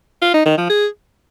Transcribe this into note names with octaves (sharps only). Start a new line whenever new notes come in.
F4
D#4
D#3
F3
G#4